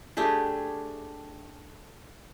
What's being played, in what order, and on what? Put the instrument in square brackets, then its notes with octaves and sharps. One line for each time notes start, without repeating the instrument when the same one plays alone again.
[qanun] A3 D4 G4 G#4